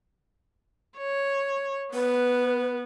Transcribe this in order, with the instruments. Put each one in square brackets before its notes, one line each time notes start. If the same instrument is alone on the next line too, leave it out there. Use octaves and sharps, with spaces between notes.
[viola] C#5
[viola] B3 [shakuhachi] B4